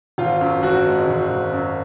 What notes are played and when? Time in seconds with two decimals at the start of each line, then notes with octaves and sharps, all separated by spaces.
0.18 G#1 F4
0.41 F#2
0.63 G#1 F#4
0.86 G#3
1.08 G#1
1.30 G#1
1.53 F#2